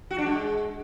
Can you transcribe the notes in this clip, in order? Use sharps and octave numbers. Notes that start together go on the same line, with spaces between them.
F#4
D4
G#3